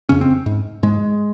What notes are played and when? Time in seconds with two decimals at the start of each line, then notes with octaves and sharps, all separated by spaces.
0.09 F2 C#3 C#4
0.21 C4
0.46 G#2
0.83 G#2 G#3